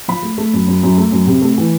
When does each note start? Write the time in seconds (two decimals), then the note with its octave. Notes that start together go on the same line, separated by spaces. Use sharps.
0.08 F3 B5
0.23 A3
0.38 A3
0.53 F#2
0.67 F#2
0.83 F#2
0.98 A3
1.12 F#2
1.27 C3
1.42 A3
1.58 E3